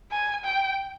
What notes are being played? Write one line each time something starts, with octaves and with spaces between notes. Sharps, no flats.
G#5
G5